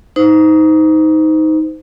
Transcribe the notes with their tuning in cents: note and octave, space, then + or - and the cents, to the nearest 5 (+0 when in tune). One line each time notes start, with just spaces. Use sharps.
D#4 +15 C5 -30